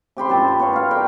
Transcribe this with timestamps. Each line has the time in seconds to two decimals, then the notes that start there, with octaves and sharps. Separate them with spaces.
0.17 C3 G4 B5 C6
0.29 F#2 A#2 A5
0.48 A5
0.60 B3 C#5 F5
0.73 F5 B5
0.91 A#4 D5 G5